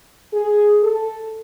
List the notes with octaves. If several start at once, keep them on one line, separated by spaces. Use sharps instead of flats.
G#4
A4